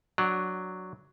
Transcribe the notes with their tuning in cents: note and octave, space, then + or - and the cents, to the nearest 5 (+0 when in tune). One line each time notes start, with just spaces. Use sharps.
F#3 +0 D4 +0 F#5 +20